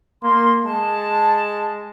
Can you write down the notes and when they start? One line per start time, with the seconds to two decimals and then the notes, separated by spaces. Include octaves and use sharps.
0.23 A#3 C6
0.65 G#3 A5